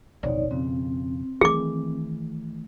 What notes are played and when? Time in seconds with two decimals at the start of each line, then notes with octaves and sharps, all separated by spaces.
0.23 D1 G#1 F2 B2 D#4 C#5 D5
0.51 F2 C#3 C4
1.41 D#3 E3 A3 G#4 D6